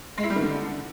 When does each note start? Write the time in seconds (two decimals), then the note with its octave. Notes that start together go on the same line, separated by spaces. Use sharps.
0.18 G#3
0.24 E4
0.30 G3
0.36 D#3
0.42 D3